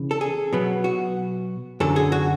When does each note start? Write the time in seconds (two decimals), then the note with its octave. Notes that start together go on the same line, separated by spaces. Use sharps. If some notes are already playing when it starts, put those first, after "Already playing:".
Already playing: C#3 E3
0.11 A4
0.21 G#4
0.53 B2 F#3 B3
0.84 F#4
1.80 F#2 D3 F#3 A4
1.96 G#4
2.12 F#4